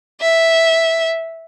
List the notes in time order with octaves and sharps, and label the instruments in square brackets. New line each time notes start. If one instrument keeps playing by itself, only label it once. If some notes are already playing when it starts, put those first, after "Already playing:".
[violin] E5